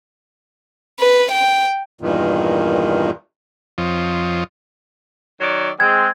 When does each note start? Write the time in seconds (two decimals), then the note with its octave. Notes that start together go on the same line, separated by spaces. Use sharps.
1.00 B4
1.31 G5
2.01 E2 G2 A#2 D#3
3.78 F2 F3 C4 F4 C#5 D#5
5.41 D#3 F#3 D5
5.80 G#3 C4 G#6